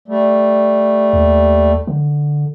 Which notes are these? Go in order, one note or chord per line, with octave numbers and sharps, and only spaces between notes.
G3 A3
D#2
D3